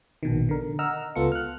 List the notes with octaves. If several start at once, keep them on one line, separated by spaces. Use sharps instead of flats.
A#1 B2 D#3
D3 A#4
D#5 F#5 A#5 E6 F6
C#2 B3 F4 A4 C#7
F6 F#6